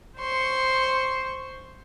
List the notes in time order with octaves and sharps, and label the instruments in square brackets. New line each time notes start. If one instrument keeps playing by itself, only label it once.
[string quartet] C5 C6 C#6